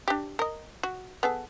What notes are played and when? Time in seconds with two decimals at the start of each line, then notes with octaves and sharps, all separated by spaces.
0.08 D4 G4
0.39 A#4 D#5
0.83 F#4
1.23 B3 G#4 A4